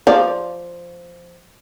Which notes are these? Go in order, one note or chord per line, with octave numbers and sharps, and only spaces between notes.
F3 D5